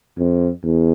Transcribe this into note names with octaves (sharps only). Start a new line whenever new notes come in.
F2
E2